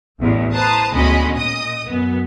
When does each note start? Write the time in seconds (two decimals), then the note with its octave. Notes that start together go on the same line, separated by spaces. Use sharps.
0.19 A1 E2
0.54 B4 C5 A5 A#5 D#6
0.93 D2 G#3 B3 C#4 D#5 B5
1.34 A#2 D#5 D#6
1.86 F#2 B3